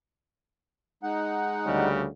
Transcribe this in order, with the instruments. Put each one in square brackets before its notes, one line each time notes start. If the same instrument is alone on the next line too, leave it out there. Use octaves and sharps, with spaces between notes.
[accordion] G#3 D#4 F#5
[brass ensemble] D2 C#3 G3